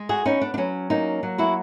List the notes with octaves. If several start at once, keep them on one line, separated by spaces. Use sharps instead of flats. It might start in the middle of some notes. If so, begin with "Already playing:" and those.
Already playing: G#3
F#4 G#4
B3 C#4 D#4
D4
D4
F#3 C#4
A#3 C#4 D#4
F#3
E4 F#4